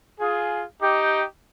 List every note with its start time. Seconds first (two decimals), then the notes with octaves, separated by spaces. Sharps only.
0.20 F4 G#4
0.81 D#4 G4